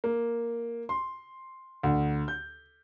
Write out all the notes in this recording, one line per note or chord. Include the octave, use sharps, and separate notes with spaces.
A#3
C6
D2
G6